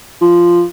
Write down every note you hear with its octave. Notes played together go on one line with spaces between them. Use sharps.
F3